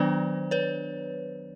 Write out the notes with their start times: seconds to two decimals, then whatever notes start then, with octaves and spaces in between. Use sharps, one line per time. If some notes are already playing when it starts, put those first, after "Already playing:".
Already playing: D#3 F#3 B3 D4 C5 D5
0.51 B4 C#5